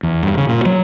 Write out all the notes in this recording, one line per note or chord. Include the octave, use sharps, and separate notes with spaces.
E2
G2
C#3
A#2
F#3